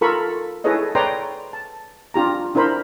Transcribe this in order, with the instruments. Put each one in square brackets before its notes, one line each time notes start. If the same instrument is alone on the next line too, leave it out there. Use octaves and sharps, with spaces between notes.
[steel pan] F4 A4 A#4 B5 C#6
E4 G#4 A4 B4 C#5 D#5
B4 C#5 D5 G5 A#5 C6
A5
D4 F4 G4 A#5
D4 E4 A#4 C5 B5